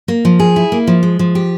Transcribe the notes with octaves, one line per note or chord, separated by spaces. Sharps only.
A#3
F3
G#4
E4
A#3
F3
G#3
F3
G4